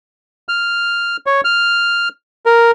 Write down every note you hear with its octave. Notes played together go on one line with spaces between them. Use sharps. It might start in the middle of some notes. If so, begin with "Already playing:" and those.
F6
C#5
F6
A#4